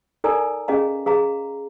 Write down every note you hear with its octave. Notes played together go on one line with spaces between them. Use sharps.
D#4 A4 A#4 D5 G#5 A#5
C#4 G#4 D#5 F5 A#5
G#4 F5 A#5